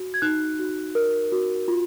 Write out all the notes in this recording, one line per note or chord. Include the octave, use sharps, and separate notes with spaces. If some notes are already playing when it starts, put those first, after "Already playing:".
Already playing: F#4
G#6
D#4 F#6
F#4
A#4
F#4
F4